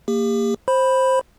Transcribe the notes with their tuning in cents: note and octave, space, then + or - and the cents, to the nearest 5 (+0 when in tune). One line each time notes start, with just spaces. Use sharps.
A#3 -20 G4 +40
C5 +10 B5 +0